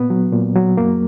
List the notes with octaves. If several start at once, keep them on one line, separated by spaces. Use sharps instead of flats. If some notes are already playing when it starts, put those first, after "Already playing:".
Already playing: A#2 B3
F#3
A#2
F#3
F#2 A#3